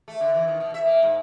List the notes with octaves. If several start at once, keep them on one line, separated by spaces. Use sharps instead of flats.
A3
D3
E3
D#3
B2
E5
A#3
G#2